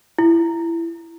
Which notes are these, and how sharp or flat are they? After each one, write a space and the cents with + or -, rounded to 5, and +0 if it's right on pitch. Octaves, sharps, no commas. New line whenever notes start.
E4 +20